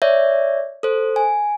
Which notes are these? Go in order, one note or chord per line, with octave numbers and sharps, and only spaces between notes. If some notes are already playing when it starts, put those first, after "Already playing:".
C#5 D5 E5
A4 C5
G#5